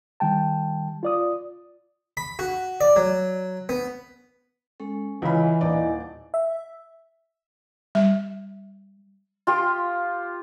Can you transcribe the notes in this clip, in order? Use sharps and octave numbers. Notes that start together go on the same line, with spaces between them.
D#3 G3 G5 A5
F4 D5 D#6
B5
F#4
D5
F#3
B3
G#3 C#4 A4
C#2 C#3 E3 E4 D#5 G#5 B5
D#1 D#4 D5
E5
G3 E5
F4 G4 C6